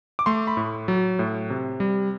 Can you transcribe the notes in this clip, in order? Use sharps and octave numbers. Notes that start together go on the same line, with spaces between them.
D6
A3 C6
B5
A2
F#3
A2
C3
G3